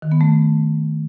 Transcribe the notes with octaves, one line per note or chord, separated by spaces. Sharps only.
D#3
B3
A3